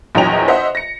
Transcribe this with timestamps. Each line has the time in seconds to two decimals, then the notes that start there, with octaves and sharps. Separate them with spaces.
0.15 A#1 E2 F#3 D#5 G5 F7
0.48 C5 D#5 E5 F#5
0.75 A#6 C#7